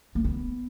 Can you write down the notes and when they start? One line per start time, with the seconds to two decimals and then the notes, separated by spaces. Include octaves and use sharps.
0.15 A#3
0.24 B3